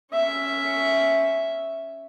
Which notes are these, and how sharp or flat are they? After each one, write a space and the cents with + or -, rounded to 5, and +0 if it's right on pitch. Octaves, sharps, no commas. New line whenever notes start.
C#4 +0 E5 +0